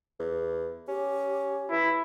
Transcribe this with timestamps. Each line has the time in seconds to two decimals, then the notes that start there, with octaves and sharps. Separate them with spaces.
0.20 E2
0.88 C#4 G4
1.71 E3 E4